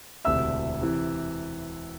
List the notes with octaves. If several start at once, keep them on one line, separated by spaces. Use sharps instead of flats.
E1 D2 C3 E5 E6
C3 E3